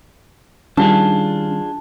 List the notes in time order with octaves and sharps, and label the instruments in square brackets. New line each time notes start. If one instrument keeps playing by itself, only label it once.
[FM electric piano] D#3 G3 [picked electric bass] C#4 [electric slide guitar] D4 F4 G#4 [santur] A5